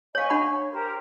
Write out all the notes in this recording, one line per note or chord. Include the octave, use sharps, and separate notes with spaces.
C#5 D#5 F5 G#5 C#6
D4 F#5 B5
C#5
G4 A#4 C5